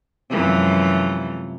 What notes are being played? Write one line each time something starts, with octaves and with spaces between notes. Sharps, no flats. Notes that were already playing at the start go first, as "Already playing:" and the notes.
F#2 C3 E3 F3 G#3 A3